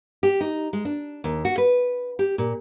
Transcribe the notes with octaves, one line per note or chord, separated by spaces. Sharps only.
G4
D#4
G#3
D4
D#2
F#4
B4
G4
A#2